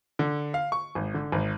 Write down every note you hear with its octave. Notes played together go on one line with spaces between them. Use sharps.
D3
F5
C#6
G#1
D3
G#1